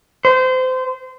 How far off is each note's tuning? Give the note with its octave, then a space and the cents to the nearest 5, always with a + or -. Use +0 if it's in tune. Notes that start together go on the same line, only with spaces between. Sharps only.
C5 -25